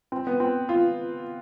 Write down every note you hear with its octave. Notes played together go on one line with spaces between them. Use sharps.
C4
B3
C4
F4